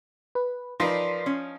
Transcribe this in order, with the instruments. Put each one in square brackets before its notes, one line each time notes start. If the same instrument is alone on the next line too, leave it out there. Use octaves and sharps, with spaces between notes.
[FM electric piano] B4
[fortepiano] F3 D#4 [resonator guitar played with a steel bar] A#4 B4 D5 [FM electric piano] C6 B6 C7
[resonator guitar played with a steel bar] C#4